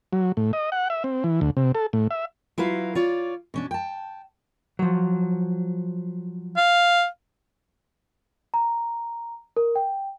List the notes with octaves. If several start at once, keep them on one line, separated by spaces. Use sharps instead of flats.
F#3
A2
D#5
F#5
E5
C4
E3
D2
C3
A4
A2
E5
F#3 E4 F4 B4 F5
F4 C#5 D5
B2 C#4 D4
G5 A5
F3 F#3
F5
A#5
A#4
G5